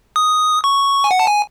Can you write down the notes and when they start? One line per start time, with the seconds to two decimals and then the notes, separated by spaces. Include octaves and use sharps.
0.16 D#6
0.64 C#6
1.04 G#5
1.11 F#5
1.19 A5
1.27 G#5